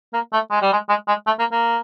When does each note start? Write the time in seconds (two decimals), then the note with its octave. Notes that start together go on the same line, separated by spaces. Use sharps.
0.13 A#3
0.33 A3
0.51 G#3
0.62 G3
0.72 G#3
0.89 G#3
1.07 G#3
1.26 A3
1.39 A#3
1.52 A#3